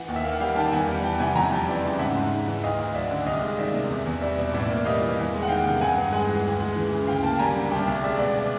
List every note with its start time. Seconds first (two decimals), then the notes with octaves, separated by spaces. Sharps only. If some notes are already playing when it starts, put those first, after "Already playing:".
Already playing: E3 F#5
0.08 D#2
0.16 E5
0.24 A#3 F5
0.33 F#5
0.40 G3 F5 G5
0.56 D#3 G5 A5
0.72 E2 F#5 G#5
0.88 G3
1.04 E3 G5 A5
1.20 C3 F#5 G#5
1.35 F2 G#5 A#5
1.52 G3 G5 A5
1.67 E3 D5 E5
1.83 C#3
1.99 G#2 E5 F#5
2.15 G#2
2.31 G#3
2.47 E3
2.63 D2 D#5 F5
2.78 D2
2.95 F#3 D5 E5
3.11 D3
3.26 C2 D#5 F5
3.42 G#3
3.58 D#3 D5 E5
3.74 C3
3.90 E2
4.06 E2
4.21 G3 D5 E5
4.38 B2
4.53 A2 D5 E5
4.69 A#3
4.85 G3 D#5 F5
5.01 E3
5.17 E2
5.33 G#3
5.43 F#5
5.48 D#3 F5 G5
5.65 C3
5.81 G2 F#5 G#5
5.97 G2
6.12 G#3 F#5 G#5
6.29 E3
6.45 D2
6.60 G#3
6.76 E3
6.92 C#3
7.07 D2 F5 G5
7.23 A#3 G5 A5
7.39 G3 G#5 A#5
7.55 D3
7.71 C2 G5 A5
7.87 C2 F5 G5
8.03 G#3 D5 E5
8.19 B2 D5 E5